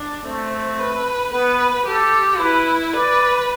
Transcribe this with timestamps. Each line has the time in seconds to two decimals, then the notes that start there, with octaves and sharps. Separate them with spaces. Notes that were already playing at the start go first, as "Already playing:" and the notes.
Already playing: D4
0.25 A3 C4
0.79 B4
1.33 B3 B4
1.86 G4 A4
2.39 E4 B4
2.93 B4 D5